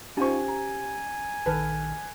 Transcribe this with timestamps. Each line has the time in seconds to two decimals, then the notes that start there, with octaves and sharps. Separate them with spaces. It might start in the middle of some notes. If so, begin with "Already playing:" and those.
0.17 C#4 D#4 F4 G4 C5 G#5 C#6
0.48 A#5
1.46 A#1 D#3 A4 B4 A5 F6